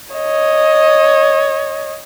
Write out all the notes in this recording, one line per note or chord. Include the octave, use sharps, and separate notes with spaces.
C#5 D#5